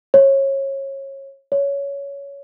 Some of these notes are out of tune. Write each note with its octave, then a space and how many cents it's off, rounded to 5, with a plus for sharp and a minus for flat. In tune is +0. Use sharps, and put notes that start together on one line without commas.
C#5 -25
C#5 +15